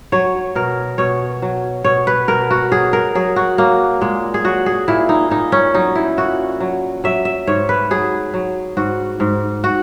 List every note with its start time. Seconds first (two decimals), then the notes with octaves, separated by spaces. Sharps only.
0.12 F#3 C#5
0.55 B2 A#4
0.98 B2 C#5
1.42 F#3
1.84 B2 C#5
2.07 B4
2.28 B2 A#4
2.51 F#4
2.72 F#3 G#4
2.93 A#4
3.15 F#3 G#4
3.36 F#4
3.58 F#3 A#3
4.01 A#2 G#3
4.34 G#4
4.44 F#3 F#4
4.66 G#4
4.88 A#2 E4
5.09 D#4
5.31 A#2 D#4
5.52 C#4
5.74 F#3 D#4
5.95 E4
6.17 A#2 F#4
6.60 F#3
7.04 F#3 E5
7.25 E5
7.47 G#2 C#5
7.69 B4
7.91 F#3 G#4
8.34 F#3
8.77 G#2 F#4
9.20 G#2
9.64 F#4